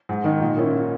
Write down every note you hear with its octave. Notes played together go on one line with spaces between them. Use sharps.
G#2
D#3 G#3 D#4
A#2
A#3 C#4 E4